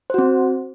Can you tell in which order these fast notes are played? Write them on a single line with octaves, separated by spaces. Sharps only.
C5 F#4 C4